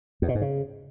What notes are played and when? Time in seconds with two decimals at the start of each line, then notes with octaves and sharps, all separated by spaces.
0.22 E2
0.29 B2
0.35 G#2
0.41 C#3